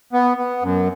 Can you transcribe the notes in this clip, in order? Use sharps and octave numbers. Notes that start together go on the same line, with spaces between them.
B3
B3
F#2